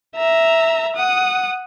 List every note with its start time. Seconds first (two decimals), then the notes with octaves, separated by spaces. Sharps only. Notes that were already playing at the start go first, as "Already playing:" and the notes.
0.16 E5 A#5
0.96 F#5 D#6